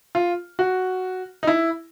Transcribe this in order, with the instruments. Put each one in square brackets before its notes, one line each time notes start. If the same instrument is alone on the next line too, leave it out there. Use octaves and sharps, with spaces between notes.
[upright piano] F4
F#4
D#4
E4